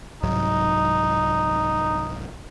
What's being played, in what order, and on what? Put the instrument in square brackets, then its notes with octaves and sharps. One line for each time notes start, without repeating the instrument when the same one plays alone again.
[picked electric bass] C2 G#2 F#3 [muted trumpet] D#4